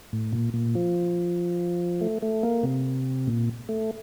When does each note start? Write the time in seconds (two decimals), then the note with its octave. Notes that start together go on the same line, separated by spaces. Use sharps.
0.13 A2
0.33 A#2
0.54 A#2
0.75 F3
2.01 A3
2.22 A3
2.43 A#3
2.63 C3
3.27 A#2
3.69 A3